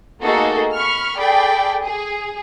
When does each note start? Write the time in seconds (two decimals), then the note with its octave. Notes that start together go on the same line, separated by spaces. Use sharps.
0.22 A3 A#3 D#4 F#4 G#4 A4
0.73 B5 C#6 F6
1.18 G#4 A4 D5 G5 B5
1.84 G#4